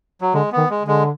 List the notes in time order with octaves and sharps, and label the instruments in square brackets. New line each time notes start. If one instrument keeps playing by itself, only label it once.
[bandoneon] F#3
[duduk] D3 [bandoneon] G#3
[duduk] D#3 [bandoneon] B3
[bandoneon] G#3
[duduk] D3
[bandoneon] G#3